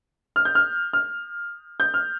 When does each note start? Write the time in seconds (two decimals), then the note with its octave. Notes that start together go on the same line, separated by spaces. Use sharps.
0.36 F6
0.45 G6
0.55 F6
0.93 F6
1.80 G6
1.94 F6